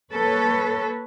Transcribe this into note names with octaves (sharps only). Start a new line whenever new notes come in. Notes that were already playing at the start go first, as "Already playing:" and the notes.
A#3 A4 B4 C#5